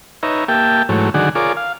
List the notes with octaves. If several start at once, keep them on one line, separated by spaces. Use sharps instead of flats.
D#4 B4 C#5 E5 A#5
A#3 G4 E5 G5 A5
G#2 E3 F#3 A3 C#5
D3 D#3 F#3 G#4 D5 F#5
F4 G#4 A#4 C#5 D5 D6
F5